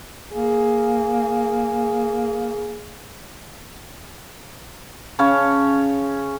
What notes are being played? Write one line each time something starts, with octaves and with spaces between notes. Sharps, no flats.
A#3 G#4
C#3 C#4 C#5 A5